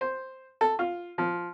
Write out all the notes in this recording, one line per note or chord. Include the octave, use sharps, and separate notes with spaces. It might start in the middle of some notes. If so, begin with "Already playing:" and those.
C5
A4
F4
F3